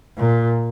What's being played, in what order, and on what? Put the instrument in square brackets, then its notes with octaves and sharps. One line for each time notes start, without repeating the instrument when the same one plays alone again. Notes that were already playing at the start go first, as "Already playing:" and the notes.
[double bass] A#2